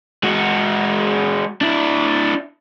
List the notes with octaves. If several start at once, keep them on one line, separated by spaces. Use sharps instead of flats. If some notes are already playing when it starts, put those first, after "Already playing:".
G#3 F#4
D4 E4